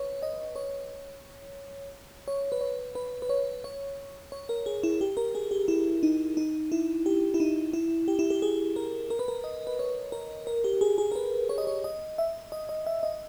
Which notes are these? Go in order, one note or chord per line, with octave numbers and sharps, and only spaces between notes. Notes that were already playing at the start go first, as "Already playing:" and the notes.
Already playing: B4 C#5
D#5
C#5
C#5
B4
C#5
B4
B4
C#5
C#5
C#5
A#4
G#4
E4
G4
A#4
G#4
G4
E4
D#4
D#4
E4
G4
E4
D#4
E4
G4
E4
G4
G#4
A#4
A#4
B4
A#4
D#5
B4
C#5
A#4
A#4
G4
G#4
G#4
A#4
B4
C#5
D#5
C#5
D#5
E5
D#5
D#5
E5
D#5